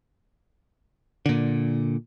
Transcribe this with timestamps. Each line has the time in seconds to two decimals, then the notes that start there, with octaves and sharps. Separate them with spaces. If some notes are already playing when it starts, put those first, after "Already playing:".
1.26 A#2 D3